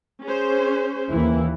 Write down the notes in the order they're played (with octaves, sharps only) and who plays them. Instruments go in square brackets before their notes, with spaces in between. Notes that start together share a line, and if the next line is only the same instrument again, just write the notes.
[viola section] C#4 G#4 C5
[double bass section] D#2 E3 [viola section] A#3 E4